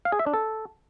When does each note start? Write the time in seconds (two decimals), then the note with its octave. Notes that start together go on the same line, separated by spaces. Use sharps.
0.05 F5
0.12 G#4
0.19 E5
0.26 D4
0.34 A4